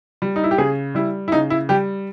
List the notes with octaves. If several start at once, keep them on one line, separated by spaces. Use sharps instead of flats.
G3
D#4
E4
G4
C#3 G#4
G3 E4
E4
C#3 D#4
E4
G3 G4